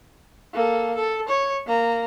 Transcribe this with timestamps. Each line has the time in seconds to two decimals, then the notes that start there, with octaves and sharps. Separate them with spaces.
0.53 A#3 A4
0.95 A4
1.28 C#5
1.66 A#3 A#5